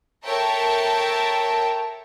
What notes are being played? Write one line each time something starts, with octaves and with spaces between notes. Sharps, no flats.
A4 A#4 C#5 E5 G5 A5